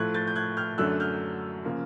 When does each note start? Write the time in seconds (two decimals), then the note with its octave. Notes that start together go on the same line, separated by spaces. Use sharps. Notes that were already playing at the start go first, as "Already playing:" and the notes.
Already playing: A2 F3 A3 F#6 G#6
0.14 G6 A6
0.27 G6
0.35 F#6 G#6
0.57 F6 G6
0.78 F#2 D3 F#3 A3 D4 E6 F#6
1.00 F6 G6
1.65 C#3 F3 A#3